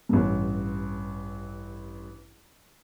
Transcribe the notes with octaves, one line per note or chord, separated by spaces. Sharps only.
A1 G2